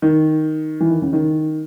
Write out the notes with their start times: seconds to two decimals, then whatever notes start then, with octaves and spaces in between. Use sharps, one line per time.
0.02 D#3
0.80 E3
0.90 D#3
1.02 C#3
1.13 D#3